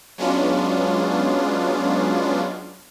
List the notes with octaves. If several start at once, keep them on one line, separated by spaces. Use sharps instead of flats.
F#3 G#3 B3 C#4 D4 F4